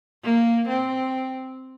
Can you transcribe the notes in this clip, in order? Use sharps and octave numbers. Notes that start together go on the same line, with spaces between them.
A#3
C4